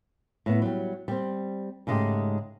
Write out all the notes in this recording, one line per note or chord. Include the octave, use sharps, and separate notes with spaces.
A2 A3 B3
F#3 G3
G3 C4
G#2 C#3 G#3 A3 G4